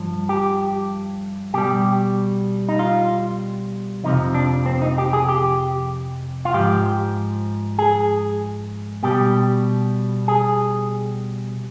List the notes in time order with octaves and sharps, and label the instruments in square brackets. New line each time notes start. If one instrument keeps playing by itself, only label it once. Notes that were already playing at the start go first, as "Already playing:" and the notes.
Already playing: [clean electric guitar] G2 F3
G4
B2 G3 G4
D#4
F4
F2 C3 F3 D#4
D4
C4
D#4
G4
G#4
G4
F4
G#2 F3 G4
G#4
B2 G3 G4
G#4